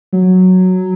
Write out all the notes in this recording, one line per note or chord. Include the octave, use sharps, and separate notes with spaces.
F#3